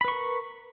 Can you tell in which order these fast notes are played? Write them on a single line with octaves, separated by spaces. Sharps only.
B5 B4 C#6 A#4